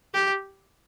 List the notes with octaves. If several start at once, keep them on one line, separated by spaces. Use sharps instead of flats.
G4